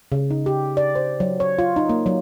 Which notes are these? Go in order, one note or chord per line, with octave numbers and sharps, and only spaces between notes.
C#3
D#4
G4
D5
C5
F#3
C#5
F4
D#4
A#3
F#3